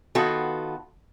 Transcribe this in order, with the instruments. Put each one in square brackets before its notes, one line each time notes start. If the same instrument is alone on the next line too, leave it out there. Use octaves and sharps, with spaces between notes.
[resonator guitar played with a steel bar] D#3 B3 F4 F#4 A4